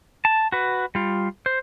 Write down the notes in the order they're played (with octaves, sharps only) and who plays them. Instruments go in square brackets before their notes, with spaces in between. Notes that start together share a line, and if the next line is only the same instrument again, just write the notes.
[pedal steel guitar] A5
F#4 B4
G3 F4
C5